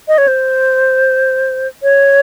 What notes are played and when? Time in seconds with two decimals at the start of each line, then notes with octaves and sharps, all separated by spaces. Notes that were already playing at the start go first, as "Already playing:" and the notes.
0.08 D#5
0.18 C#5
0.28 C5
1.83 C#5